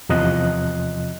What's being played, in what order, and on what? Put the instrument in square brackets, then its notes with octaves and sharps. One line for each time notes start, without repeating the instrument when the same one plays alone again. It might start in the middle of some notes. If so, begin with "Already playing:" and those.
[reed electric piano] E2 C3 F3 D#5 F#6